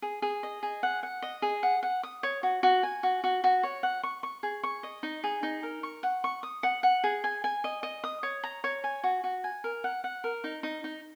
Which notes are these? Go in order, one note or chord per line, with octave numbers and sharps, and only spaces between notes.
G#4
G#4
D#5
G#4
F#5
F#5
D#5
G#4
F#5
F#5
D#6
C#5
F#4
F#4
G#5
F#4
F#4
F#4
C#5
F#5
C#6
C#6
G#4
C#6
D#5
D#4
G#4
D#4
A#4
C#6
F#5
C#6
D#6
F#5
F#5
G#4
G#5
G#5
D#5
D#5
D#6
C#5
A#5
C#5
G#5
F#4
F#4
G#5
A#4
F#5
F#5
A#4
D#4
D#4
D#4